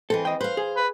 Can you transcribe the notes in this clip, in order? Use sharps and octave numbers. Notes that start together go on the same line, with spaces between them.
E3 G#3 C4 A4
D#5 G5
B4 C5 F5
G#4
B4